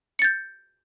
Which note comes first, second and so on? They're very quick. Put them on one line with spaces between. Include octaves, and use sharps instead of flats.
C#7 A6 G6